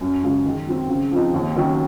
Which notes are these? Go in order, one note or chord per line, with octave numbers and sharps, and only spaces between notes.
F#2
C#3 G#3
D#3
F#3 C4
C#3
F3 C4 D#4
D#2
D#3 F#3 C#4 F#4